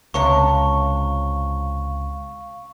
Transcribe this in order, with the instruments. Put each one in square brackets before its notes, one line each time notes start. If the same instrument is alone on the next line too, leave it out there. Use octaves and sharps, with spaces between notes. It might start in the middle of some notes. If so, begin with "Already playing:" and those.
[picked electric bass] C#2 [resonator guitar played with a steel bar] C3 C#5 A5 [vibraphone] F5 [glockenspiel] C#6